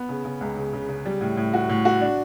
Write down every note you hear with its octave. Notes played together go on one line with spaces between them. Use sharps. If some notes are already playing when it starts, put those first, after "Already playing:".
Already playing: B3
C#3
C#3
C#2
C#3
C#3
C#3
G3
A2
A2
F#4
A2
F#4
D4